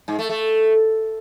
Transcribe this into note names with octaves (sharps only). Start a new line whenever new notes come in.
G#2
A3
A3